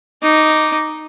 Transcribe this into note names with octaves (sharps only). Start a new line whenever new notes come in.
D#4 D6